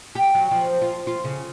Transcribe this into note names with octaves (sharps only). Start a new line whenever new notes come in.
G4
F#3
F3
F4
F4
C#3